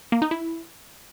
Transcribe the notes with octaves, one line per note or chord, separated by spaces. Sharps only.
A#3
D#4
E4